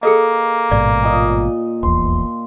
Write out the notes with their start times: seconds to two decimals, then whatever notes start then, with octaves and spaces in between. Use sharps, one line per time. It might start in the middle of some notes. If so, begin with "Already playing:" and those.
0.03 A#3 G#4 A4 D#5
0.71 A1 G#2 B2 D5
1.03 A#2 D#5
1.83 D#1 A#1 E2 C6